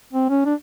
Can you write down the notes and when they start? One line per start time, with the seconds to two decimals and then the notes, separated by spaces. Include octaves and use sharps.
0.13 C4
0.29 C#4
0.46 D4